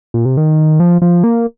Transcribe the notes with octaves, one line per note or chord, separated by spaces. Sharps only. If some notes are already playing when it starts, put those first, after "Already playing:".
A#2
C3
D#3
F3
F3
A#3